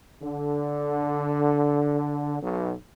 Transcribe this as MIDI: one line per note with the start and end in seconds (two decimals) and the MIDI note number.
0.23 2.42 50
2.42 2.73 35